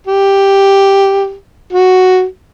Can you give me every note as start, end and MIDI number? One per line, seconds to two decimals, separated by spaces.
0.07 1.34 67
1.73 2.24 66